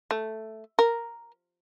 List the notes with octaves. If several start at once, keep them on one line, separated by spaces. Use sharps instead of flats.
A3
A#4